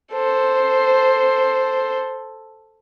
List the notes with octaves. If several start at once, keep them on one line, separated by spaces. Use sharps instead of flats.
A4 C5